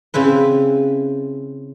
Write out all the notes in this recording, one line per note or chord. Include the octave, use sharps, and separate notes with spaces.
C#3 C4 E4 B4